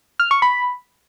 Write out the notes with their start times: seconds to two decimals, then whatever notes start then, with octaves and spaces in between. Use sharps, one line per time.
0.20 F6
0.31 C#6
0.42 B5